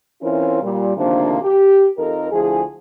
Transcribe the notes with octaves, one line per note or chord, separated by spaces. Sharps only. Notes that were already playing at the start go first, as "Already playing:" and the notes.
E3 C4 C#4 E4 F4 A#4
A#2 G3
D2 C3 D#3 F3 A#3 D4
G4
F2 D#4 A4 A#4
D2 F3 E4 G#4